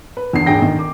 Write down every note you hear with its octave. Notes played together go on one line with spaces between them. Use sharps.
B4
E2 D3 C7
D#1 G#1 D2 G#4 G5 A#6
D#3
D6